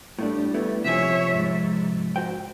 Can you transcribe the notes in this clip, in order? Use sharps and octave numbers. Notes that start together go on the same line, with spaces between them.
A2 G3 A3 D4
A3 B3 E4
C3 F3 C#5 E5 G#5
G#2
F#4 C5 G5